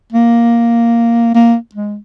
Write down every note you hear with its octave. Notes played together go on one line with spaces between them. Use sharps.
A#3
A#3
G#3